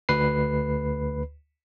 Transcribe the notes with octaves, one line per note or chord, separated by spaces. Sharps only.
D2 B4 C7